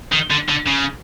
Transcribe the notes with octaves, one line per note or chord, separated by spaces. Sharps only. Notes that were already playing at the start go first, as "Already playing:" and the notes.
D#3
D3
D3
C#3